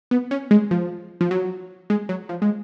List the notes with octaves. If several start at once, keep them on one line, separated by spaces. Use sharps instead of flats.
B3
C#4
G#3
F3
F3
F#3
G#3
F#3
F3
G#3